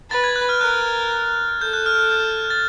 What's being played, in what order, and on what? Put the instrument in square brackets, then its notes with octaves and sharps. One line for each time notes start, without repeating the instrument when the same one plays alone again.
[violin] B4 [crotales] A6
[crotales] G#6
F#6
F6
[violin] A#4 [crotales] F#6
[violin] A4 [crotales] G6
[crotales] F#6
F6
F#6
G6
A6